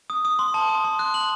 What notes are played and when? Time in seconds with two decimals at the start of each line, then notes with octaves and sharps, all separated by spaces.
0.10 D#6
0.25 D#6
0.39 C6
0.54 A5
0.69 D#6
0.85 C6
0.99 F#6
1.14 F#7